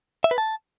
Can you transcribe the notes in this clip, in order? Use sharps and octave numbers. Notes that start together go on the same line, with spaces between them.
E5
B4
A5